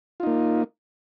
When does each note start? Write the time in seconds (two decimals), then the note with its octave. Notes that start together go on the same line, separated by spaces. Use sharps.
0.20 F4
0.23 D#4
0.27 A#3